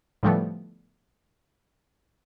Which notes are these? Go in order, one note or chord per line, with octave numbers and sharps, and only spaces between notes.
A2 D3 F3 G3 A3 B3